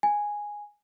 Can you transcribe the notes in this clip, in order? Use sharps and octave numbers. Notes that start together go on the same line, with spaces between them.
G#5